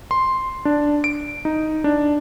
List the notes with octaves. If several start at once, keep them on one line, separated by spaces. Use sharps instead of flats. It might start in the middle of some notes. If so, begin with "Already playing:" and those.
C6
D4
D7
D#4
D4